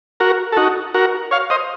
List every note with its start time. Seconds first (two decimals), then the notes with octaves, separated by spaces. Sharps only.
0.20 F#4 A#4
0.52 A4
0.57 D#4 F#4
0.94 F#4 A#4
1.31 C#5 F5
1.50 C5 D#5